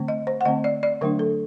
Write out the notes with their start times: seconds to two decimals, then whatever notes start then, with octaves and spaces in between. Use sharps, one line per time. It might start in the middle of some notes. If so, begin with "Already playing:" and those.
Already playing: D3 A3 C4
0.08 D#5
0.27 C5
0.41 F#5
0.45 D3 A3 C4 D#5
0.64 D5
0.83 D5
1.01 D3 F#3 A3 D4 A#4
1.19 A4